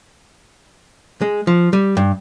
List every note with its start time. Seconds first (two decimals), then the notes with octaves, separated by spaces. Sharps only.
1.21 G#3
1.47 F3
1.73 G3
1.97 G2